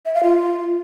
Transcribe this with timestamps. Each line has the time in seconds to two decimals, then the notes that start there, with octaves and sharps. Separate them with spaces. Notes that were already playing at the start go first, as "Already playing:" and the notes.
0.06 E5
0.14 F5
0.23 F4